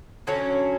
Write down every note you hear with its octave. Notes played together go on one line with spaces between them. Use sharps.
D3 F#3 C#4